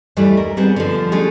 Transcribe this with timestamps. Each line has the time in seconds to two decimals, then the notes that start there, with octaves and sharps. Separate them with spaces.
0.17 D#2 E3 G3 A3
0.37 A#4
0.57 G3 B3 C4 G#4
0.76 D3 F3
1.12 A3 C#4 D4 G4 G#4